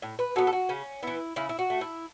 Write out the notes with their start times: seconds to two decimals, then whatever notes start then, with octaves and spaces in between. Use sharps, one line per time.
0.02 A2
0.19 B4
0.36 F#3 B3 A4
0.47 A4
0.53 F#4
0.69 C#3 C#4
1.03 E3 B3 E4
1.36 C#3 E4
1.49 E4
1.59 F#4
1.70 A3
1.81 E4